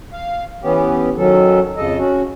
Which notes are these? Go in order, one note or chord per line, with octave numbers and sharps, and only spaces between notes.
F5
E3 B3 C#4 G4
D#3 F#3 C#4 A4
F2 C#3 A4 D#5
C#4 F#4